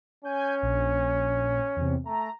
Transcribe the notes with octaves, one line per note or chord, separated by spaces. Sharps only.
C#4 G#5 G6
A#1
E2 C3
A3 A#5